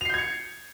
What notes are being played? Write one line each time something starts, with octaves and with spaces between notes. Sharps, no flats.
G6 G#6 C7 C#7 F7